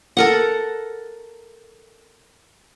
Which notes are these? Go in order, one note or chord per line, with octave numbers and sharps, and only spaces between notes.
A4 A#4 F#5